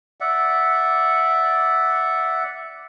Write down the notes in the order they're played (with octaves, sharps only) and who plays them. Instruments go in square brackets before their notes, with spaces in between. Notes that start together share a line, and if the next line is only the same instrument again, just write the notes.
[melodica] D5 E5 F#5